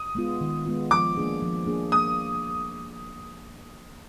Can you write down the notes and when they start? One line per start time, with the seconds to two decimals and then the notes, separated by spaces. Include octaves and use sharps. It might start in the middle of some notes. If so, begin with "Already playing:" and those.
Already playing: D#6
0.15 G#3 B3 F4
0.41 D#3
0.66 G#3 B3 F4
0.91 F3 D6
1.17 A#3 D4 G#4
1.42 F3
1.67 A#3 D4 G#4
1.92 A#3 D#6